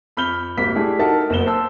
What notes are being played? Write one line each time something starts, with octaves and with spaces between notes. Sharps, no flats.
F2 B5 F6 G6 G7
G#1 C3 A#3 B6
G#3 A3 D4 E4 G4 G#4
D#4 F#4 A4 A#4 E5 A5
F#1 B3 E7 G7
C5 A5 E6